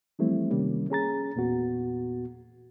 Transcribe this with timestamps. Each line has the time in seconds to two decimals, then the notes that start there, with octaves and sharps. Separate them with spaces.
0.19 E3 F3 G3 A3 C4 E4
0.51 C3 D#3 G3 A#3 C#4
0.90 C#4 G#4 A#5 A6
1.36 E2 A#2 B3 F#4